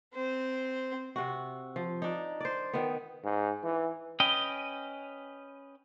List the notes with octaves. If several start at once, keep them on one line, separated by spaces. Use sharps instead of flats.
C4 C5
C3 F#4
F3
D4 D#4
C5 D5
D#3 B3
G#2
E3
C#4 B4 D#5 G5